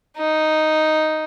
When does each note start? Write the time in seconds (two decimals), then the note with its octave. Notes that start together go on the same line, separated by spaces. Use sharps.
0.17 D#4